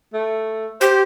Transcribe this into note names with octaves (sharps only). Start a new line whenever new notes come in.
A3
G4 C5